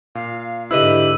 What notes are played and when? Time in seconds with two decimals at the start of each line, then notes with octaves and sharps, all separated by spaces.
0.15 A#2 F5
0.71 G#2 D3 E4 G4 B4 D#5 E6 D#7